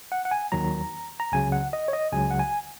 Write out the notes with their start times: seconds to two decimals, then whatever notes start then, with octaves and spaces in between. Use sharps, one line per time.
0.12 F#5
0.25 F#5
0.31 G#5
0.52 D#2 D#3 F#3 A#5
1.20 A#5
1.32 C#2 C#3 F#3 G#5
1.52 F#5
1.73 D#5
1.88 C#5
1.93 D#5
2.12 C#2 C#3 F#3 G#5
2.30 F#5
2.39 G#5